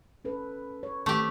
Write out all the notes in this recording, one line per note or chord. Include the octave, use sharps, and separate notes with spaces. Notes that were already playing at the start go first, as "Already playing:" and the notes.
C#4 A4 B4
C#5
D#3 A3 C4 G4